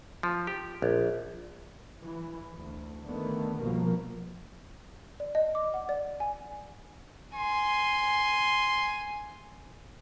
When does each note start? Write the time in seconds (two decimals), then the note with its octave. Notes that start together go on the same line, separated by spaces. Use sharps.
0.23 F3
0.47 G4
0.82 A#1
2.03 E3
2.55 D2
3.07 D3 D#3 A3 B3
3.60 C2 G2 B2 F3 A#3
5.20 D5
5.35 D#5
5.55 D6
5.74 F#5
5.89 D5
6.20 G#5
7.35 G#5 C6